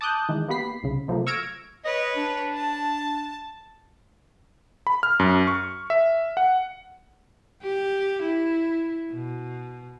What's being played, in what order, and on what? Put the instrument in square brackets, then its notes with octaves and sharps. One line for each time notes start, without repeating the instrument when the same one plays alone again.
[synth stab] A5 D6 D#6 F#6 G6
D#3 E3 G#3
A#3 B3 G4 B5 B6 C7
C2 C#3
C3 F3 F#3 A3 A#3
C#6 E6 F6 G#6 A#6 D7
[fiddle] B4 C#5 [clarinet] D#5
[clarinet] D4
[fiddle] A5
[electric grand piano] B5
F6
F#2
C#6
E5
F#5
[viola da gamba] G4
E4
B2